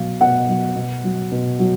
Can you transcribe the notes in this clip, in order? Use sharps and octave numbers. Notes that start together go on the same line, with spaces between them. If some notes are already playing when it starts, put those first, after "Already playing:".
Already playing: B2 F#3 F5
B2 F#5
F#3
B2
F#3
B2
F#3